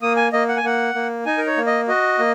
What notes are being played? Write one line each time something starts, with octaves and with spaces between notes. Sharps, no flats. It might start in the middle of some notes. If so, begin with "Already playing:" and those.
A#3 D#6
G#5
A#3 D#5
F#5
G#5
A#3 F#5
A#3
D#4 G#5
A#4
C#5
A#3
D#5
F#4 D#5
A#3